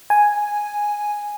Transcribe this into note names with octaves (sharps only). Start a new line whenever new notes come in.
G#5